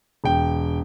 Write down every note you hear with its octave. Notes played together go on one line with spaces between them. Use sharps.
E1 G5